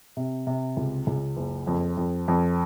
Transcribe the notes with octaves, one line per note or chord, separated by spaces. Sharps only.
C3
C3
C#2
C#2
F#1
F2
F2
F2